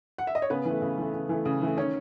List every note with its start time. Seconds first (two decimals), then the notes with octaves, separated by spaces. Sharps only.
0.18 F#5
0.27 E5
0.35 D#5
0.42 C#5
0.50 C#3 B3 B4
0.65 E3 A3
0.82 C#3
0.98 E3 A3
1.14 C#3
1.29 E3 A3
1.45 C#3
1.62 E3 A3
1.77 D#3 C#4 C#5